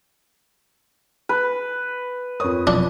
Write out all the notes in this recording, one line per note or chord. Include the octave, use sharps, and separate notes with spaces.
B4
F2 A#4 C#5 D#6
B2 F3 F#3 D4